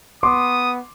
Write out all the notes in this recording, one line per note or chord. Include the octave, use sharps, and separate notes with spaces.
B3 C6 D6 D#6